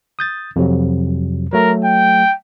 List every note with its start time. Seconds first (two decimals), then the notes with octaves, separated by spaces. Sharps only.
0.19 D#6 G6 A6
0.56 F2 C3 F#3
1.53 F#3 A3 A#4
1.85 G5